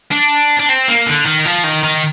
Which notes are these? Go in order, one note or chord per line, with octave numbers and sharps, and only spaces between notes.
D4
D4
C4
A#3
D3
D#3
F3
D#3
D#3